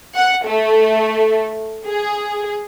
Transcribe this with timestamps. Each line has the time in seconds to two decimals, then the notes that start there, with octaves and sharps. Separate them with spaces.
0.15 F#5
0.46 A3
1.87 G#4